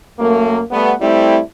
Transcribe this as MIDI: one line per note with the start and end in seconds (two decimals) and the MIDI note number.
0.20 0.61 42
0.20 0.61 57
0.20 0.61 58
0.71 0.93 55
0.71 0.93 57
0.71 0.93 59
1.01 1.39 55
1.01 1.39 57
1.01 1.39 60
1.01 1.39 64